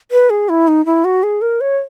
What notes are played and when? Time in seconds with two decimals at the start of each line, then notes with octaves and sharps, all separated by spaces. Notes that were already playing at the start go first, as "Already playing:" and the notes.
0.11 B4
0.30 G#4
0.49 E4
0.68 D#4
0.86 E4
1.04 F#4
1.23 G#4
1.41 A#4
1.61 C#5